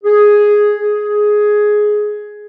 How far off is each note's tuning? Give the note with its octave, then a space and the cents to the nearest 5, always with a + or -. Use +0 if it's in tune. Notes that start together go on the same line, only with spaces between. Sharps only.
G#4 +0
G#4 +10